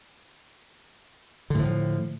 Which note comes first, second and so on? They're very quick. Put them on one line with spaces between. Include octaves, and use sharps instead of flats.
D3 A2 F3